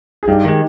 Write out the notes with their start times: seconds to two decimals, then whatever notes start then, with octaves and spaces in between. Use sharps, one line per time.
0.23 G#4
0.28 G2 D#4 G4
0.44 D#3 G#3